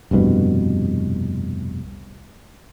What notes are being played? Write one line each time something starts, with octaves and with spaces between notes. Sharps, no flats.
F1 C2 G2 B2